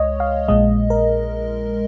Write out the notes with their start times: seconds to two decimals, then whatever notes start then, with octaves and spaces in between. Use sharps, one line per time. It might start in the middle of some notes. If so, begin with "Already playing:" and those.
Already playing: C#2 G#3 C#5 D#5
0.20 F5
0.48 A#1 A#2 G#3 D#5
0.90 A#4